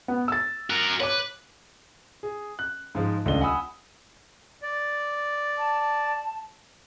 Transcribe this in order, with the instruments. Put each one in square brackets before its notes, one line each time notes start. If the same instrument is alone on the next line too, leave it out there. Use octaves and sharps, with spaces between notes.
[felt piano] B3
E6 A6
[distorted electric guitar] F#4 A#4
[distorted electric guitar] B4 [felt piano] C#5 D6
[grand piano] G#4
F#6
G#2 F3 G#3
D#1 C#2 A3 D4 D#5 G7
F#5 G#5 B5 D#6 E6
[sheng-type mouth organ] D5
[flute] A5